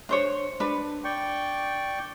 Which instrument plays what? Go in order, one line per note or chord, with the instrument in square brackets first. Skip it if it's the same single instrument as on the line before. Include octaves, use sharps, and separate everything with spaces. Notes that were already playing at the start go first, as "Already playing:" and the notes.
[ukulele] D4 C5 C#5
D4 B4
[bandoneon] D5 G5 C#6